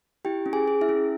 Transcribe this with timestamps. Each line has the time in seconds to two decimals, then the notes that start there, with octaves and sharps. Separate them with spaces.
0.25 E4 G4 G5
0.46 C#4
0.53 G#4 G#5
0.68 G#4
0.81 E4 E5
0.89 C#4